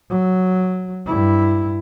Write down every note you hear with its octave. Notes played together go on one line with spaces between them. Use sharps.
F#3
G2 E4